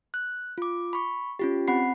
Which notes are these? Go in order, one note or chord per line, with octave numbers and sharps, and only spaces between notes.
F#6
F4 D6
B5 C#6
C#4 F4 G4
C4 F#5 B5 C7